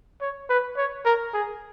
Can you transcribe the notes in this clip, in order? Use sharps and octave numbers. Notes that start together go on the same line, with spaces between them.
C#5
B4
C#5
A#4
G#4